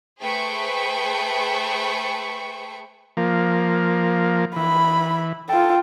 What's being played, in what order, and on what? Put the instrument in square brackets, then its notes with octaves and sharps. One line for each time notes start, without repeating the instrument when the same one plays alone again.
[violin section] A3 G#4 B4 C5 G5 C#6
[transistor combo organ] F3 A#3
[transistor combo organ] E3 [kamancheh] B5
[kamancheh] F4 G5 [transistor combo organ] A4